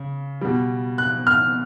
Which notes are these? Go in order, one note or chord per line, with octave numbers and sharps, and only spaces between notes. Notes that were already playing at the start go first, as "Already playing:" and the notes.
Already playing: C#3
B2 G3
F#6
F6